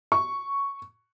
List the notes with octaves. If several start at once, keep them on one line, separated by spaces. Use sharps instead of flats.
C#6